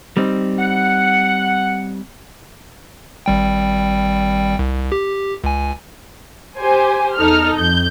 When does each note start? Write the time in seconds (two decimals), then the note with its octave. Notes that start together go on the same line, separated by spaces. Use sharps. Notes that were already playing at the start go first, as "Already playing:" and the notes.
0.17 G3 C4 D#4
0.59 F#5
3.26 G#1 G3 G5
4.59 C2
4.92 G4
5.44 C#2 G#5
6.58 G4 C5 G#5
7.15 E2 D#4 A4 F6
7.54 F2 G6